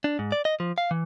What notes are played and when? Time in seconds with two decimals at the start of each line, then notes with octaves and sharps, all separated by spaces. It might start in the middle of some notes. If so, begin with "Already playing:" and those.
0.04 D4
0.19 G#2
0.32 D5
0.45 D#5
0.60 F3
0.78 F5
0.91 E3